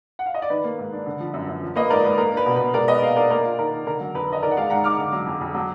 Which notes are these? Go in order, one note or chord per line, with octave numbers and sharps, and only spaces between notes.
F#5
F5
D#5
D5
D#3 B4
A#3
G#2
D4
D3
F3
F#2
F#2
F3
A#3 B4 D#5
G#2 A#4 D5
G#2 B4
A#3 A#4
D4 B4
B2
B2 B4
G#3 A#4 D5
B3 B4 D#5
A#2 D5 F5
D4 A#4 D5
A#3 A#4 D5
F4
D#3 A#4
D#3
D3 A#4
F#3
F2 B4
D4 D#5
D#3 A#4 D5
F#5
G#3 D5 F5
G#2 F#5 A#5
D#4 D6 F6
D3
F#3
F2
F2
F#3